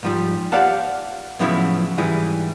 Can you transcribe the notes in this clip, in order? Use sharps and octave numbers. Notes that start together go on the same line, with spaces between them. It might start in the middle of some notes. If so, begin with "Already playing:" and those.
G#2 F3 G3
G4 C5 D5 F5 F#5 A5
A2 C#3 F3 F#3 B3 E4
G#2 E3 G3 E4 G#4